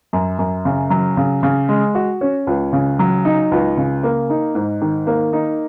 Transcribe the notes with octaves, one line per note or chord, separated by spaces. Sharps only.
F#2
F#2
C#3
F#3
C#3
C#3
G#3
F#4
C#4
C#2
C#3
F#3
D#4
C#2
C#3
A#3
D#4
G#2
D#3
A#3
D#4